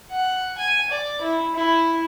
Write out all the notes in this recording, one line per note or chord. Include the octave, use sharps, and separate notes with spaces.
F#5
G#5
D5
E4
E4